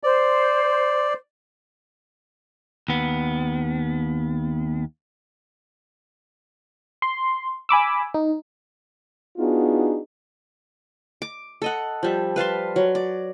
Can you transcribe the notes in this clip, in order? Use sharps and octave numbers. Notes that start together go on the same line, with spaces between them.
C5 D5
D#2 B3
C6
G#5 B5 D6 E6
D#4
B3 D4 D#4 F4 F#4 G#4
D6
A4 D#5 F#5
F3 G3 E5
B4 F5 A5 C6
F#3
D5